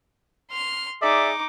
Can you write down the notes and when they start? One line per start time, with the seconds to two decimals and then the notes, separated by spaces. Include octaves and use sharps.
0.50 C6 F6
1.02 D#4 G#4 D5 E5 D6